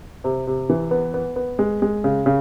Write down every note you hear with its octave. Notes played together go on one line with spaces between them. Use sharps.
C3
C3
E3
B3
B3
B3
G#3
G#3
C#3
C#3